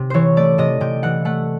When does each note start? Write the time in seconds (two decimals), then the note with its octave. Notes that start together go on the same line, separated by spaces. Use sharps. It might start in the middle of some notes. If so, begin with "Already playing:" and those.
Already playing: C3
0.10 E3 C5 C#5
0.37 A3 D5
0.58 C3 D#5
0.81 C3 G5
1.03 E3 F#5
1.25 A3 F#5